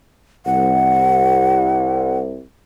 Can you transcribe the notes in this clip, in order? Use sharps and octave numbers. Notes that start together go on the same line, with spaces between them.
C2 F#5